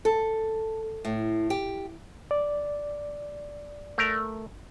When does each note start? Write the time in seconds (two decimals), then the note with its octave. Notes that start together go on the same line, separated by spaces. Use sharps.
0.05 A4
1.05 A2
1.50 G4
2.31 D5
3.98 A3 A#4